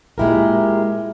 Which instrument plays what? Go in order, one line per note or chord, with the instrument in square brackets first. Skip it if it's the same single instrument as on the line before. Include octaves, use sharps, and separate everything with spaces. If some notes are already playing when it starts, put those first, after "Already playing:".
[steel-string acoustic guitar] A#2 G#3 E4 G4 A#4